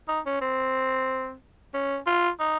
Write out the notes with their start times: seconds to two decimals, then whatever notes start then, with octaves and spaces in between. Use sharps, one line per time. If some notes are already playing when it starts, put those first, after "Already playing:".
0.08 D#4
0.26 C#4
0.41 C4
1.74 C#4
2.06 F4
2.40 D#4